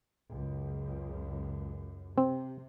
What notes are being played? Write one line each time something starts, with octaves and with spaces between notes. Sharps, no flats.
C#2 F#2
C3 C4